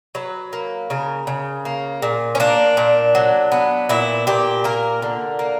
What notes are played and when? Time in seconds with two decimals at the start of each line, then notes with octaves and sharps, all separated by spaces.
0.15 F#3 B4
0.53 A#3
0.90 C#3 A#4
1.27 C#3
1.65 A#3
2.02 A#2
2.35 C#4
2.40 A#3 D4
2.77 A#2
3.15 F#3
3.52 B3
3.89 A#2 E4
4.27 A#2 G4
4.64 A#3 A#4
5.02 D3
5.39 A#3